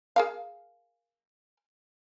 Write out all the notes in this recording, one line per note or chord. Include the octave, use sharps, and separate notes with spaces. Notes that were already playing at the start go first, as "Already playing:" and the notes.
G#4 A#4 F5